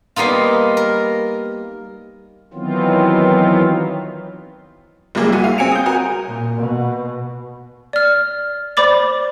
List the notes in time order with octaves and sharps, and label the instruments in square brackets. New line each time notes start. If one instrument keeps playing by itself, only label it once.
[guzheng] G3 A#3 B3 D#4 F4
A#4
[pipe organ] D#3 E3 F#3 B3 C4 F4
[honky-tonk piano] F#1 G3 G#3 A#3 G#4
C2 F#4 D#7
F5
C4 G#5 C#7 D7 F7
D#6 G6
F#4 A#4 G#5
[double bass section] A#2
B2
[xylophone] D5 F6
C5 D5 B5 D6 A6